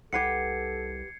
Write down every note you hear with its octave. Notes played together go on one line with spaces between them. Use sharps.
C2 G4 A4 B4 F#5 G#6 C7 C#7